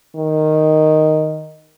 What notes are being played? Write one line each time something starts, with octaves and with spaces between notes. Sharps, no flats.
D#3